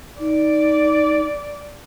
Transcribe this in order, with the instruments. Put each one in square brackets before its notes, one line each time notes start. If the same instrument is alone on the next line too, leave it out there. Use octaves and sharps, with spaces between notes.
[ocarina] D#4 [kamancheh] D5